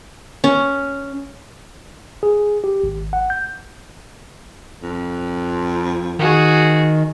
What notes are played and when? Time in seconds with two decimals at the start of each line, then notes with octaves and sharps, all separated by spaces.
0.44 C#4
2.23 G#4
2.64 G4
2.84 G#1
3.13 F#5
3.30 G6
4.82 F2
6.19 D#3 F#4 G#4